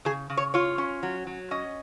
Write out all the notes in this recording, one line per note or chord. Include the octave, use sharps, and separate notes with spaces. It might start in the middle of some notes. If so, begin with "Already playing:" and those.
C#3 G#4
C#3
C#5
F4 C#5
C#4
F#3
F#3
C#4 D#5